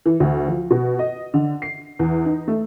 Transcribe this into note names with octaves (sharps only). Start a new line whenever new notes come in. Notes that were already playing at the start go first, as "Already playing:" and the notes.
E3
D2
F3
B2
D#5
D3
C7
E2
D#4
A3